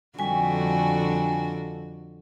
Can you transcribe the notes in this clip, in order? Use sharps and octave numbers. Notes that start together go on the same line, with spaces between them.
F2 D3 G3 F#4 G#5